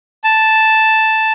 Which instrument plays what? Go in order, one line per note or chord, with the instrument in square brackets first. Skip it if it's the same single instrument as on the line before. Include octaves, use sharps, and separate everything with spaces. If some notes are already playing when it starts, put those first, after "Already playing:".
[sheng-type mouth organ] A5